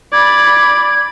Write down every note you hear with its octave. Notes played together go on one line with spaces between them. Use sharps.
D5 B5 G#6